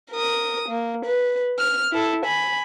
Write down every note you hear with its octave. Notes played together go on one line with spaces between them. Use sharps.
A#4 D#6
A#3
B4
F6
E4 A4
G#5 B5